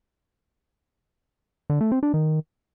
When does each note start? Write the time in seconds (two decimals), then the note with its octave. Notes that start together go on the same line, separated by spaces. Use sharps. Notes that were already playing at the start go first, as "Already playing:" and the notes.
1.70 D3
1.81 A3
1.92 C4
2.03 D4
2.14 D#3